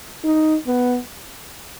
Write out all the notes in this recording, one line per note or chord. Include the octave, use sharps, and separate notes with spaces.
D#4
B3